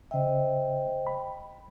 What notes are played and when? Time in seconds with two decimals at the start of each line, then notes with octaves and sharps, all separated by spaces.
0.11 C#3 C5 D#5 E5 G5
1.07 B5